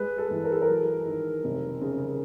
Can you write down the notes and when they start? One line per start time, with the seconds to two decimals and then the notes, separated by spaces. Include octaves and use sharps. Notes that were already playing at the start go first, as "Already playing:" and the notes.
Already playing: G#3 B4
0.18 A4
0.31 E3
0.44 A#4
0.52 A4
0.61 A#4
0.69 F#3
1.06 D#3
1.44 F1
1.81 C#3